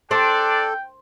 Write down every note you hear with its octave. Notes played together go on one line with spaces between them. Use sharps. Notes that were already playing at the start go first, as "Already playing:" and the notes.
D4 A4 C5 D5 G5